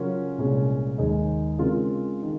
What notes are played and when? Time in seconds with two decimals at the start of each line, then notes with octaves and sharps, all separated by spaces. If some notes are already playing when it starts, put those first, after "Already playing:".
Already playing: C#3 F#3 C#4 F4 A#4
0.38 C2 A#2 G#3 C#4 G#4
0.98 D#2 D#3 G#3 D#4 G#4
1.58 C#3 G#3 C4 F4 A#4
2.23 D#3